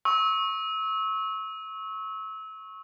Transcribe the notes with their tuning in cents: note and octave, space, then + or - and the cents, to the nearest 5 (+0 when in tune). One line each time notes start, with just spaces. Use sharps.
C#6 -20 E6 -30